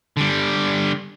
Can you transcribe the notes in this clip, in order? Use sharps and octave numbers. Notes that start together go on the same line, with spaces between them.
D3 G3